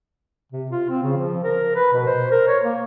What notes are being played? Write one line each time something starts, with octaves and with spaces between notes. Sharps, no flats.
C3
F4
C4
C#3
F3
A#4
B4
B2
C5
A#4
C#5
A#3